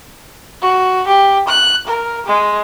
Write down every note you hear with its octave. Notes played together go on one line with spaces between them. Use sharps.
F#4
G4
F#6
A#4
G#3